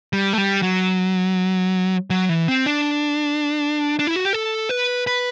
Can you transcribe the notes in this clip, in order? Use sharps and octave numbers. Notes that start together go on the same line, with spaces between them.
G3
A3
G3
F#3
F#3
E3
C4
D4
D4
E4
F#4
G4
A4
B4
B4